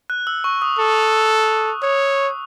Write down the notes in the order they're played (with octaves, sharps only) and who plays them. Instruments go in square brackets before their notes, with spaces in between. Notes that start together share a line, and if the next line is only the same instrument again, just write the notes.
[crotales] F#6
E6
C#6
D#6
[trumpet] A4
[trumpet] C#5 [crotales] D#6